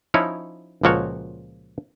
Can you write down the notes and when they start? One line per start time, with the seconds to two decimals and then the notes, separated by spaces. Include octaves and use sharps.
0.14 F3 C#4 D#4 E4 C#5
0.83 C#2 A#2 F3 F#4 C#5